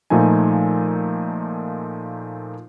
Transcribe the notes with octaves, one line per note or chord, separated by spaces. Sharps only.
A#2 F3 A3 D#4 G#5